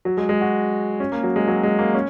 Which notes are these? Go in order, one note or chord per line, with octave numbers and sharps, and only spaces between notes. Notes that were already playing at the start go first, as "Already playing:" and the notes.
F#3
G#3
G#3
F#4
C#4
A#3
F#3
G#3
F#3
G#3
A#3
C#4